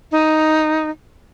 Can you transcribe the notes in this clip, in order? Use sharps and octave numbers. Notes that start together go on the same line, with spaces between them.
D#4